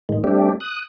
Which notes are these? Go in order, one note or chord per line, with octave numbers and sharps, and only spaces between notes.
A2 D#3 G#3
G3 A3 C4 D4 G4
D#6 F#6